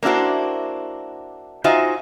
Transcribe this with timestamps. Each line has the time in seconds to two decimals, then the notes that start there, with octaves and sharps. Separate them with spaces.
0.03 A#3 D4 E4 F#4 C5
1.64 D#4 F4 F#4 C5 E5 G#5